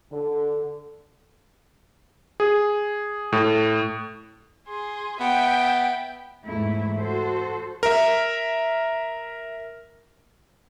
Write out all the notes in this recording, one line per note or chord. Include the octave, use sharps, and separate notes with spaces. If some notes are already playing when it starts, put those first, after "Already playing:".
D3
G#4
A2
G#4 C6
B3 E5 G5
E2 G#2 A3 E4
F#4 A4 C5
A#4 E5